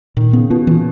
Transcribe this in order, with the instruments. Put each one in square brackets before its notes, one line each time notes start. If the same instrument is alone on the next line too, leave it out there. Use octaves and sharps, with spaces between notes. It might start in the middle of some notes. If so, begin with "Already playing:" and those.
[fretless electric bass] A#2 [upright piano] D#3
[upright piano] C#3 [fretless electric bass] B3
[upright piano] B2 [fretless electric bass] B3
[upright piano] A#2 [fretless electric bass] E3